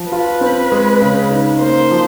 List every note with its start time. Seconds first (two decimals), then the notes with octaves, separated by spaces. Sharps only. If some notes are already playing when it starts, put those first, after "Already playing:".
Already playing: F3
0.11 F4 B4
0.41 C4
0.72 G#3
1.02 C#3
1.31 D#4
1.60 A#3 C5
1.91 F3